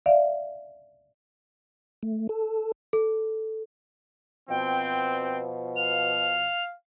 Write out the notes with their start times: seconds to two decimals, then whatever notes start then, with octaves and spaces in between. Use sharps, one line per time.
0.06 D5 E5 F5
2.03 A3
2.29 A4
2.93 A4
4.49 B2 F3 C4 G5
5.76 F5 F7